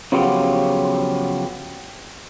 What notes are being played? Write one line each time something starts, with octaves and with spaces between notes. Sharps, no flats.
C#3 F3 F#3 B3 F4 G4